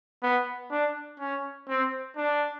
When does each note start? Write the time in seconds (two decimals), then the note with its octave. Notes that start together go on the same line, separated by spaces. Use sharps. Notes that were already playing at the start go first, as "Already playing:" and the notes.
0.23 B3
0.71 D4
1.20 C#4
1.69 C4
2.16 D4